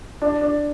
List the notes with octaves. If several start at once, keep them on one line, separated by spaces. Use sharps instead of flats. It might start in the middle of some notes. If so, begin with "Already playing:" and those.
D4
D4